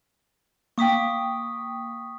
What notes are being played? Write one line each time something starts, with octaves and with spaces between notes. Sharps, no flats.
A#3 G5 C#6 D#6 B6